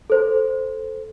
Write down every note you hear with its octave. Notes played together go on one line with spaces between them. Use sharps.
A4 C5